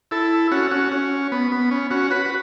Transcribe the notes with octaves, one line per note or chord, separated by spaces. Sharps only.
E4 A4
C#4 F#4
C#4 F#4
C#4
B3
B3
C#4
C#4 F#4
F#4 B4
F#4